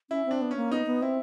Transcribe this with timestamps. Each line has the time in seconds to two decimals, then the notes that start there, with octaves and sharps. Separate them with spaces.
0.10 C#4 E4
0.26 C4
0.31 D4
0.41 B3
0.51 C#4
0.56 A#3
0.71 B3 D#4
0.87 B3
1.02 C4 E4